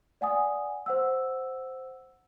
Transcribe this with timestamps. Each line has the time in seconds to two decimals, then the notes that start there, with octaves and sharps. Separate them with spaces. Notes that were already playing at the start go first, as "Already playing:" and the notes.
0.21 D5 F#5 G#5 D#6
0.86 C5 F#5 E6